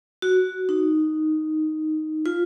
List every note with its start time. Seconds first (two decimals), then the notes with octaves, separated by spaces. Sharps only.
0.22 F#4
0.69 D#4
2.26 F4